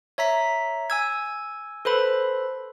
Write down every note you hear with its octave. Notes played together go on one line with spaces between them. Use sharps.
C#5 E5 A#5 B6
G#5 E6 G#6
A4 B4 C5 B5